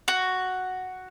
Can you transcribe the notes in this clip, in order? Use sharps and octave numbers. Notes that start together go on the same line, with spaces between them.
F#4